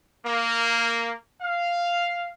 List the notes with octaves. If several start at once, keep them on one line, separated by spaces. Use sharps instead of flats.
A#3
F5